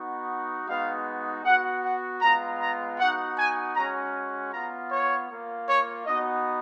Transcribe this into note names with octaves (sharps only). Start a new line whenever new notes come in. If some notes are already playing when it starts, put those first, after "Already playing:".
Already playing: B3 D#4 F#4
G#3 B3 D#4 F#4 F5
B3 F#4 F#5
F#5
G#3 B3 F4 A#5
A#5
B3 D#4 F#4 F#5
G#5
G#3 C#4 F#4 A#5
B3 F4 A#5
C#5
A#3 F4
C#5
B3 D#4 F#4 D#5